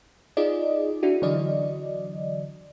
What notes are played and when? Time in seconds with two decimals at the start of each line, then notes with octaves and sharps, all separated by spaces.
0.37 D#4 F4 G#4 D5 D#5
1.03 D4 E4 F#4
1.22 D3 E3 F#3 D5 D#5